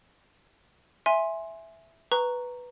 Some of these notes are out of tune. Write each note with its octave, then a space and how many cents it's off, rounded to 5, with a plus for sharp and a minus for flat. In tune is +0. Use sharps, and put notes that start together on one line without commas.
E5 +0 G#5 +0 C6 +10
B4 +0 A#5 -5 C#6 +0